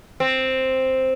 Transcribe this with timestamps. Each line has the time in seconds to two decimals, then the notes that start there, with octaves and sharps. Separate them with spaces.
0.20 C4